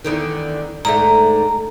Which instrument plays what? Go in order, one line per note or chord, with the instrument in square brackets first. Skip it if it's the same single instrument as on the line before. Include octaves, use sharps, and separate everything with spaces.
[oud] E2 D3 D#3
[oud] G#2 D3 A3 [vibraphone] A#5